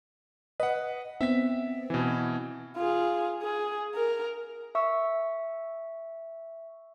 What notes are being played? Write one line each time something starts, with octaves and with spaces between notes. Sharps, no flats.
B4 D#5 F#5
B3 C4 E5 B6
B2 E3
F4 G#4
G#4
A#4
E5 C#6 E6